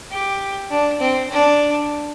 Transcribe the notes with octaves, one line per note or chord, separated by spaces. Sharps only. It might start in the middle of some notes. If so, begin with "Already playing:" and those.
G4
D4
C4
D4